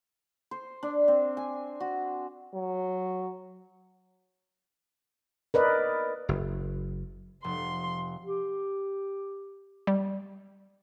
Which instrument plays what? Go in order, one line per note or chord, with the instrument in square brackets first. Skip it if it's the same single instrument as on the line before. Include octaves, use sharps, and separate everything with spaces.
[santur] C5
D4
C4
G#5
F#4
[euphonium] F#3
[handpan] A#4 B4 D5 D#5
[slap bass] F#1
[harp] F1 [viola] C6
[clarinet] G4
[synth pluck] G3